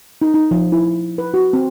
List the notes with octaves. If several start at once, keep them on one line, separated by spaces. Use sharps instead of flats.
D#4
D#4
F3
E4
B4
F#4
C4